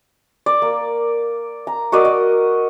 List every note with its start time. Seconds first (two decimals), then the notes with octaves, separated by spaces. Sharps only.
0.46 D5
0.62 A#3
1.67 A#5
1.92 F#4 A#4 D5 D#5
2.05 D#5